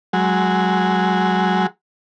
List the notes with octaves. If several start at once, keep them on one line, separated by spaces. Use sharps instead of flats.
F#3 G#3